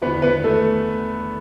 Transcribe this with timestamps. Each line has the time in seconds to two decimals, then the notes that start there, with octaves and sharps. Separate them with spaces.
0.02 E2 D3 B3 B4
0.22 B3 B4
0.44 A3 A4